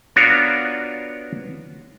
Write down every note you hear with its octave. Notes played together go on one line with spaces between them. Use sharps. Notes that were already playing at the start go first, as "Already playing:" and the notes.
B3 D4 F4 F#4 A#4 C#5